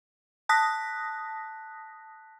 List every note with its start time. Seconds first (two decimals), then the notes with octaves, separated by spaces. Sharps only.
0.49 A5 D#6 F#6 A#6 B6